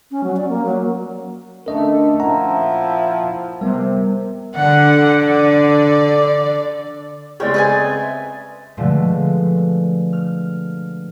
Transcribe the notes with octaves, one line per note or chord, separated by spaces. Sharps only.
C#4
F#3
D5
A#3
F#3
D3 A3 C#4 D4 A#4 D#5 A5
A#2 F3 E4 F#5 A5 A#5
C3 G3 B3 A#4 C5 G5
D3 F#5
D5
C#3 G#3 C4 C#5 D5 G5
B4 D#5 G#5
E5
B2 D3 F3 G#3 A3
F6